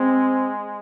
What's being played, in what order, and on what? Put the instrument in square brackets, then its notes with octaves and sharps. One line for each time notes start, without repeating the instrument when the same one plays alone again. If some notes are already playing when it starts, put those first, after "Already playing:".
Already playing: [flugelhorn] G#3 [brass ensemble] C4